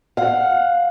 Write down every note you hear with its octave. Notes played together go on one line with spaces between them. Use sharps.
F5 F#5